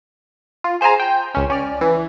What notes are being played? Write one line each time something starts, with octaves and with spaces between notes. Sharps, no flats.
F4
G#4 C5 F5 G#5 A#5
G5
C#2 C#4
C#4 D5 F6
E3